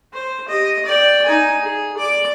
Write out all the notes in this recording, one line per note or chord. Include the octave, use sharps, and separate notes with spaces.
C5
G4 D#5
D5 G5
D#4 G#5
G#4
D5 D6